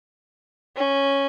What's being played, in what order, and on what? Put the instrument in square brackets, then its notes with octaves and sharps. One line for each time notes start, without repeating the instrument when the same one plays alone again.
[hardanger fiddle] C#4